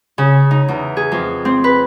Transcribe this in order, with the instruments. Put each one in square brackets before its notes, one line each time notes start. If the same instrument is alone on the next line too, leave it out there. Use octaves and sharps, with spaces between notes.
[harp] C#3
D#4
E2
G#4
F2
C4
B4